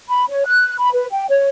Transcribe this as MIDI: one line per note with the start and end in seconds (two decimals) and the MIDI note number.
0.09 0.25 83
0.30 0.44 73
0.46 0.75 90
0.79 0.89 83
0.93 1.06 71
1.11 1.25 79
1.30 1.49 73